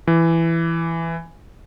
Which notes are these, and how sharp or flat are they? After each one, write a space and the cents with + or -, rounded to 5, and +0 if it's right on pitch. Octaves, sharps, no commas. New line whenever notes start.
E3 +10